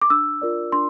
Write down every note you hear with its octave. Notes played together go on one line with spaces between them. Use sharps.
D6
D4 E6
F4 A#4 D5
D4 C6